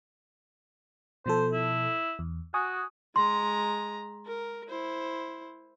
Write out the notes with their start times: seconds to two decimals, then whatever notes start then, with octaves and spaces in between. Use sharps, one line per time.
1.26 B2 F3 A4 C5
1.52 E4
2.19 E2
2.54 F#4 G#5 C#6 D#6
3.16 G#3 A#5 C6
4.26 A#4
4.69 E4 C5